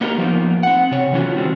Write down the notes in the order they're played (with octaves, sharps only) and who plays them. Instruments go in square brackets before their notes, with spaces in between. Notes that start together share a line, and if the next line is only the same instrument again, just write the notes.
[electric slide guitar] A#3 B3 D#4 G4 A#4 A#5
F3 A#3 B3 D#4
C4 F#5
C3 C#5
E3 F#3 B3 C#4 F4 F#4
D#3 G3 G#3 C4